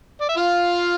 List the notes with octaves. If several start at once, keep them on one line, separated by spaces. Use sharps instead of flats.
D5
E5
F4 F5